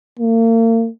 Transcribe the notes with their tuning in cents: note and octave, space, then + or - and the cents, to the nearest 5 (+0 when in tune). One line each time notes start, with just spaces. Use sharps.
A#3 -40